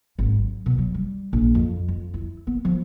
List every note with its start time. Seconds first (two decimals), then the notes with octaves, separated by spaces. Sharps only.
0.19 G#1
0.39 F#3
0.66 B2
0.78 F#3
0.94 G3
1.33 A#1
1.55 F2
1.88 F2
2.14 E4
2.47 B3
2.65 F3